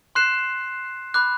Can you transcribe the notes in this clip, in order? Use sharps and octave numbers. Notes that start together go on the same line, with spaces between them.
C6 F#6 C7 E7
B5 D6 F#6